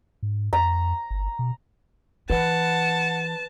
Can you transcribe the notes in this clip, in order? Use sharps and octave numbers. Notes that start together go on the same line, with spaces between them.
G#2
F2 A#5
G1
B2
E3 B4 F#5 A5